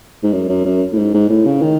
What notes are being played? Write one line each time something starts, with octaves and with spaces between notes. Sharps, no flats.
G#2
F#2
F#2
F#2
A2
G#2
G#2
A2
C#3
D#3